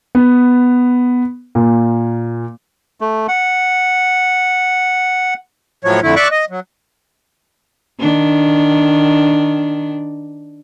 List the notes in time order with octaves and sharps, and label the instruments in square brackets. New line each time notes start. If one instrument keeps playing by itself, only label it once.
[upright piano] B3
A#2
[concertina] A3
F#5
[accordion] A2 F3 F#3 C#5
F2 D3 A3 E4
D5 E5 C#6 D6 F#6
D#5
F#3
[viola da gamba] D#3 D4